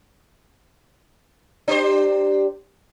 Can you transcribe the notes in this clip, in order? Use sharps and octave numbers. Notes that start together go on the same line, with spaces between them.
D4 G4 C5